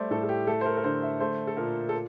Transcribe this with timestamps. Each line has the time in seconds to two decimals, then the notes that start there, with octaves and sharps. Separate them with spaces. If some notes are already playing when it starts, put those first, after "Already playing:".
Already playing: G3 A3 C5 D5
0.11 A2 A4
0.23 A4
0.29 G4
0.47 A3 A4
0.61 C5
0.66 A#4
0.77 A#4
0.84 D3 C5
1.02 E5
1.20 A3 C5
1.47 A4
1.57 A#2 A#4
1.89 A4